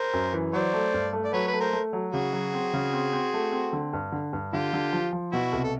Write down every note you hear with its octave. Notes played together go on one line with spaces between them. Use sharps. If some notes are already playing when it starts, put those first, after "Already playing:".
Already playing: A#4 C5
F#2
E3
F#3 C5 D5
A3
G2
A3
D5
F#3 B4 C#5
B4
A3
A#4 C5
A3
F#3
C#3 F#4 G#4
F#3
C4
C#3
C4
C4
A3
C4
D3
G2
D3
G2
D3 F4 G4
D3
F3
F3
B2 E4 F#4
C2
A4